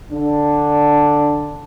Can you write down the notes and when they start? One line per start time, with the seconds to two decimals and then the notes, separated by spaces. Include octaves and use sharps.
0.12 D3 D4